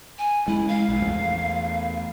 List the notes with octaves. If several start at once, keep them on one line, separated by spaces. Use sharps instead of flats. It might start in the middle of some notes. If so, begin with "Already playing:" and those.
G#5
G#3 C#4 E4
F5
A#1
E2 A3